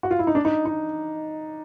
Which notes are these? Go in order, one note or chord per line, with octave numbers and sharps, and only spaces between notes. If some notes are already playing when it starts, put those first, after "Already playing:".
F#4
F4
E4
D#4
D4
D#4
D#4